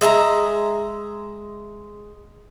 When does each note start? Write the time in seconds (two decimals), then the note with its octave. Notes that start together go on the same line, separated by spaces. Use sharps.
0.01 G#3 E5 A5 A#5